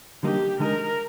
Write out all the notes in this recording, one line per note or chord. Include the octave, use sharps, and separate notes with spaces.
D3 G3 A#3 D#4 G4
D3 G#3 D#4 A#4